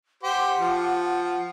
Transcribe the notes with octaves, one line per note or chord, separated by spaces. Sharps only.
G4 C5 F#5
F3